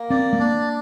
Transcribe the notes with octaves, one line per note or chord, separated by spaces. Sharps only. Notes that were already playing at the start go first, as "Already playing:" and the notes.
Already playing: A#3
C4 D5
A3
A#3 D4